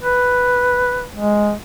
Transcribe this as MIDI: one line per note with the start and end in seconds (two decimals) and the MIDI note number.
0.03 1.06 71
1.16 1.53 56